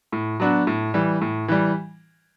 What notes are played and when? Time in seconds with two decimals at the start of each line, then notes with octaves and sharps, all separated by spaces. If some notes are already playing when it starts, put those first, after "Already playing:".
0.12 A2
0.40 F#3 B3 D4 F#4
0.67 A2
0.94 E3 G3
1.21 A2
1.48 E3 G3